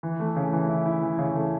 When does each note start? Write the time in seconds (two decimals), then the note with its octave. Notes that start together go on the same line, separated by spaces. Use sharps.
0.03 E3
0.20 A3
0.36 C#3
0.53 E3
0.69 E4
0.86 E4
1.02 E3
1.18 C#3
1.35 A3